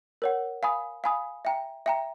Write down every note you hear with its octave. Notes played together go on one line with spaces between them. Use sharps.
A#4 C#5 F#5
F5 G#5 B5 D#6
F5 G#5 B5 D#6
E5 G5 A#5
E5 G5 A#5